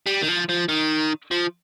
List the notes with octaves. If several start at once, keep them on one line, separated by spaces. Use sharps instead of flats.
G3
D#3
F3
F3
D#3
F3